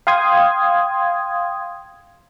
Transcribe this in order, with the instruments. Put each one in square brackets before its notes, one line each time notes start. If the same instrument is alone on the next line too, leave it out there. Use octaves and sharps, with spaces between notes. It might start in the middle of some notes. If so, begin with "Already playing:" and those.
[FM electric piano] F5 G5 C6 D#6 G#6